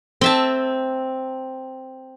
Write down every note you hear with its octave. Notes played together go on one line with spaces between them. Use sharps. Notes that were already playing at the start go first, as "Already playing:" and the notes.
C4 E5 A5